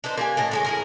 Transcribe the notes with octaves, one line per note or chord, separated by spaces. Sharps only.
D4 D#4 B4 C5
A#3 G4 G#5
A2 D4 D#5
A2 F#3 G#3
E4 G#4 A#4